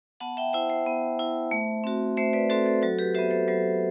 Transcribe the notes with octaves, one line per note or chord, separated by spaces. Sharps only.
B3 F#5 A5
E5 G5
E4 C5 E5
C5 E5
B3
E4
A3
C4 F#4
A3 C5 E5
B4 D5
C4 F#4 A4 C5
A4 C5
F#3 F#4 A4
G4 B4
B3 F#4 C5 E5
A4 C5
F#3 A4 C5